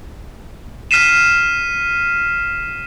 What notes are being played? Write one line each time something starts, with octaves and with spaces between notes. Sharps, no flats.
F6 B6 C7 D#7 E7